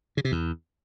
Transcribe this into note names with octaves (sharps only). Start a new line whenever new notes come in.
C#3
C3
E2